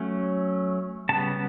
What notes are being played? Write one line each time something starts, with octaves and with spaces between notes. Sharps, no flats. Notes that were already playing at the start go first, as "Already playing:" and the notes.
Already playing: F#3 A3 C#4
C#3 G3 B3 A5